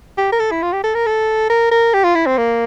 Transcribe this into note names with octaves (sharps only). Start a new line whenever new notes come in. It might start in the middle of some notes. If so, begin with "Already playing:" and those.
G4
A#4
A4
E4
F4
G4
A4
A#4
A4
A#4
A#4
G4
F4
E4
C4
A#3